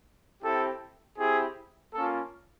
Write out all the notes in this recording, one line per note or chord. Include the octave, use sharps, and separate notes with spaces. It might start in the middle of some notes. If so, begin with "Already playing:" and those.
C4 E4 G4 A4
C4 E4 G4 G#4
A#3 C#4 F4 A4